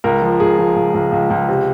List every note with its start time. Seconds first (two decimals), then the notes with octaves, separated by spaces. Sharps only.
0.04 C#2 A#4
0.22 F3
0.40 C#2 G#4
0.59 F3
0.76 C#2
0.94 C#2
1.12 C#2
1.30 C#2
1.48 C3